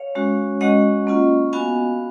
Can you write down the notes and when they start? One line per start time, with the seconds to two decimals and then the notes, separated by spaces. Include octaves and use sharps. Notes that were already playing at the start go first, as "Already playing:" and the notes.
Already playing: C#5 F5
0.15 G#3 C#4 F#4
0.61 G#3 C#4 F#4 D#5 F#5
1.07 A#3 C#4 F4
1.53 B3 F#4 F5 G#5